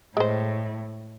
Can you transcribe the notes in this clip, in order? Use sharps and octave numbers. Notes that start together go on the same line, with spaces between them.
A2 G#3 C5